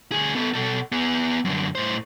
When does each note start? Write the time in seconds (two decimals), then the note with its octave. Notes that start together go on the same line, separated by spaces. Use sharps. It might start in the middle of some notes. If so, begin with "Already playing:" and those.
0.12 D2 G#4
0.35 B3 A4
0.54 B2 A4
0.92 B3 G#4
1.45 F#2 D3
1.75 A2 C5